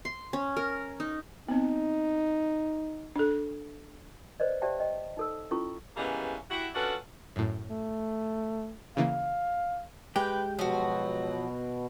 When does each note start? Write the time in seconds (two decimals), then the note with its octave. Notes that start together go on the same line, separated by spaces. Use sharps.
0.05 C6
0.33 C#4
0.57 A#4
1.00 D#4
1.49 B3 C4 D#4
3.16 D4 A4
4.40 B4 C5 D5 D#5
4.62 G4 C5 D5 E5 G5 A5
4.80 D#5 G5
5.17 D#4 A4 E6
5.51 C#4 E4 F4 A4 C#6
5.96 E3 G3 G#3 A#3 B3 C#4
6.51 E4 F#4 G4
6.75 C#4 D4 F4 F#4 A4 B4
7.36 F#2 A2
7.70 A3
8.97 C#3 E3 A#3 F5
10.16 G#3 G4 B4 G5
10.59 B2 F3 F#3 F#4